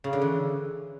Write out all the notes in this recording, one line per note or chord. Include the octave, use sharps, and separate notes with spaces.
C#3
D3
E3